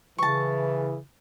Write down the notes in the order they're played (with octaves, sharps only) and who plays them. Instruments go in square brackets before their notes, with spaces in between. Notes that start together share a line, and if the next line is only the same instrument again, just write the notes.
[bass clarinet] C#3 [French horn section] E3 [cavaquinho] A5 C#6